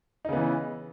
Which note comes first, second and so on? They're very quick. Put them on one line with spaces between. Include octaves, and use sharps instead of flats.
D#4 C#3 B3 E3